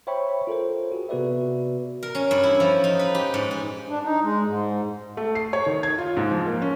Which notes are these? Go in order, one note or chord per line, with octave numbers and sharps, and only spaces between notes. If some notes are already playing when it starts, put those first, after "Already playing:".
C5 C#5 E5 G5 B5 C#6
F4 A4 A#4 C5
F#4 G#4
C3 B3 F#4 B4 D5 E5
A#4
C#4
G2
E4
F3
D#4
B4
G4
G#2
G#4
D4
D#4
G#3
G#2
A3
C7
C#5
D#3
G#6
F4
G#2
F3
A#3
C#4